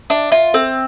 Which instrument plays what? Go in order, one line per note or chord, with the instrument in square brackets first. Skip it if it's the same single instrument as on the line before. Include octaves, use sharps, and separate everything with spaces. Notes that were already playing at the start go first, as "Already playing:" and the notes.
[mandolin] D4 [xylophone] E5
[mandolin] F4 [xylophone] E5
[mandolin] C4 [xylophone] A4